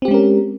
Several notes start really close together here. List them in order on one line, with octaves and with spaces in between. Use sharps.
C4 G4 G#3 C#4 A#4